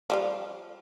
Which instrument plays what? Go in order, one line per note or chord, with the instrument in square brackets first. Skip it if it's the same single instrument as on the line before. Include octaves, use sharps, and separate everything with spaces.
[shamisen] F3 G3 F4